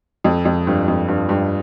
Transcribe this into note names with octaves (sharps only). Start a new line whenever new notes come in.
F2
F2
G2
F2
G2
G2